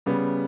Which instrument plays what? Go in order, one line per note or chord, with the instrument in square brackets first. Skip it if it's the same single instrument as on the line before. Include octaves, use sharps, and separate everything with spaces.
[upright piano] C#3 G3 B3